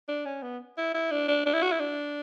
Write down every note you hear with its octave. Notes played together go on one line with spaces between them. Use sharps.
D4
C#4
B3
E4
E4
D4
D4
D4
E4
F#4
E4
D4